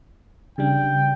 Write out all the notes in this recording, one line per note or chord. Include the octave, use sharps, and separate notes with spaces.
C#3 G3 D4 G5